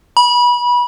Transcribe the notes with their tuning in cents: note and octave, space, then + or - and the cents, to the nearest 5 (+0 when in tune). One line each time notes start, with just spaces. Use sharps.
B5 -25